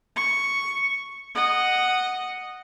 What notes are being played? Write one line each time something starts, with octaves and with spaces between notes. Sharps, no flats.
C#6
D#5 F#5